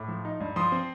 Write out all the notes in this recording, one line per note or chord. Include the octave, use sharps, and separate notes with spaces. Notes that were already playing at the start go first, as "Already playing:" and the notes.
Already playing: A2 D6
F3
D#4
G2
F3 C6 D#6
C4